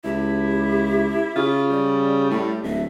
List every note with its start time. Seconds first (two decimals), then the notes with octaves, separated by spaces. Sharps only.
0.04 C#2 E4 G4
1.36 C#3 F4
1.70 G3 D5
2.30 A2 A3
2.64 D1 E5